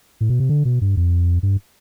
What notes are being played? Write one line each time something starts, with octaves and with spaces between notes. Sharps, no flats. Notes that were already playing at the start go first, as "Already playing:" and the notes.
A2
B2
C3
D3
B2
G2
F2
G2